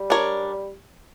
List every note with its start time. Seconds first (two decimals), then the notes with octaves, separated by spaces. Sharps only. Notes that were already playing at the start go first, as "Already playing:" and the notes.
Already playing: G3
0.10 D4 A#4 C#5